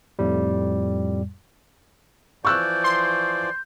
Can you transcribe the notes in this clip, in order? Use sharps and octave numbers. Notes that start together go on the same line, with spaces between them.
F2 A2 G3
E3 F3 D5 C#6 E6 F#6 G6
C6